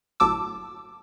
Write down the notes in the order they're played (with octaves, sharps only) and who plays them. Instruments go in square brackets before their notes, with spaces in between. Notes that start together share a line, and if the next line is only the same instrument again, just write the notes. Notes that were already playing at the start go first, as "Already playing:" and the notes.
[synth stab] G1 A2 F#3 A5 D6 E6